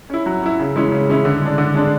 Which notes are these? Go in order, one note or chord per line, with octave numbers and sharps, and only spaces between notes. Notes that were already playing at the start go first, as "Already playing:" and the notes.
C#4 E4
F#3
C#4 E4
C#3
E3 G#3 C#4 E4
C#3
E3 G#3 C#4 E4
D3
G#3 D4
D3
G#3 D4